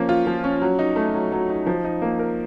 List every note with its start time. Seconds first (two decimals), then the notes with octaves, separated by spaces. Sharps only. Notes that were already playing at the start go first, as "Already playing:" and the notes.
Already playing: F3 A#3 C#4
0.09 F4
0.27 F3
0.44 C#4
0.62 F#3
0.79 D#4
0.96 A3
1.14 F#3
1.32 F#3
1.50 D#4
1.67 F3
1.84 D#4
2.02 A#3
2.19 A#4